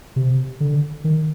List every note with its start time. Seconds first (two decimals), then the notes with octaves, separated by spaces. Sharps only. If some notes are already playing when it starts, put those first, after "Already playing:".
0.16 C3
0.60 D3
1.04 D#3